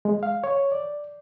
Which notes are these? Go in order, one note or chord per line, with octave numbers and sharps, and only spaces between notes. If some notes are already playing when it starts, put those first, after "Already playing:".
G#3
F5
C#5
D5